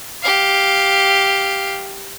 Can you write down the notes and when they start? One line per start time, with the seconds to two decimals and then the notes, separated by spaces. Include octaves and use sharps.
0.22 G4 F5